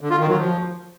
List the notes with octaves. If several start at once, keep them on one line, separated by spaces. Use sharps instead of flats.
D3
F4
D#3
F#3
F3